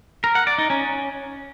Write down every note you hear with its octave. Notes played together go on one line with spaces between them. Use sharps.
A#4
F#5
D5
D#4
C#4